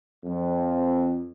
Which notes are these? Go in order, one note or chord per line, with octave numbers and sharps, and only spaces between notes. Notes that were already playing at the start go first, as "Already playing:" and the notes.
F2